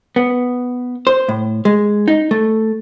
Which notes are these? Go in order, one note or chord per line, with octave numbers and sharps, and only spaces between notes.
B3
C5
A2
G#3
D#4
A3